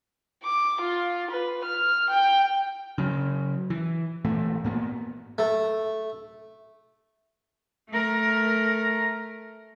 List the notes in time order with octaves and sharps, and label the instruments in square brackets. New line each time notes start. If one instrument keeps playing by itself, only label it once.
[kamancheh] D6
F4
B4
F6
G5
[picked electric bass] C#3 F#3
E3
G#1 A#2 E3 A3
G#2 A#3 B3
[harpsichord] A3
[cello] A3 A#4